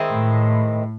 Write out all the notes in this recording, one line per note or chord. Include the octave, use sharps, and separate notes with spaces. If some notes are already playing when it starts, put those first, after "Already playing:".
Already playing: D#3 G#3 C4 E4
A2